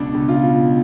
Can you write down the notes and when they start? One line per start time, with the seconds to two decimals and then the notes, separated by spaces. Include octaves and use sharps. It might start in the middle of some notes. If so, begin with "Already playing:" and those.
Already playing: C#2 B2 D4
0.14 C#2
0.29 F4
0.43 B2